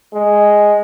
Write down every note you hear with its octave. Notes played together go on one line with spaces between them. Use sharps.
G#3